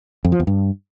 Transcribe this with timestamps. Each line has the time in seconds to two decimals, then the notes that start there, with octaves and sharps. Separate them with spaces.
0.25 F2
0.32 F3
0.40 E2
0.47 G2